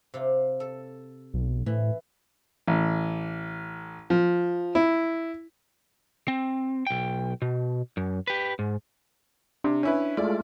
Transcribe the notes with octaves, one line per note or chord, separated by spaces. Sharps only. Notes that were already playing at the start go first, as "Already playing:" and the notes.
C3 F4
A4
B1
A2 E3
A1
F3
E4
C4
B1 G5
B2
F#2
G4 B4
G#2
C3 D4
C#4 E4 B4
G#3 A3 E4 F4 D5